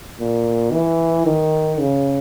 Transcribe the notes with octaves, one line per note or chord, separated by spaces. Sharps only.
A#2
E3
D#3
C#3